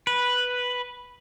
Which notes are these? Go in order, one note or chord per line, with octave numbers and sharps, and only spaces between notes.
B4